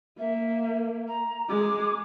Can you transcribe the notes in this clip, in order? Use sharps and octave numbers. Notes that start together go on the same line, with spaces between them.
A#3 E5
A#5
G#3 G#4 D6